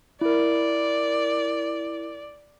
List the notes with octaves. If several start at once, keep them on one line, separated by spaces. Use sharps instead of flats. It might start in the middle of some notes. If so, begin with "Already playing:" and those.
E4 A#4 D5